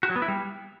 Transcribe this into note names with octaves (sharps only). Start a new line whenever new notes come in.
F#4
F#3
B3
E4
G3